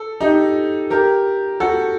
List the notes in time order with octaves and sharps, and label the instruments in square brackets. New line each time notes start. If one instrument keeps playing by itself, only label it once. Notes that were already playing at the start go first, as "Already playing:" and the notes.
Already playing: [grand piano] A4
D#4 G4
G4 A#4
F#4 A4